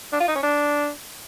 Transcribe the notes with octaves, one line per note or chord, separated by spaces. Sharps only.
D4
F4
D#4
C#4
D4